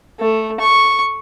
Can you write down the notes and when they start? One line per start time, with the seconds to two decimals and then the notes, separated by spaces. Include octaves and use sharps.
0.20 A3
0.60 C#6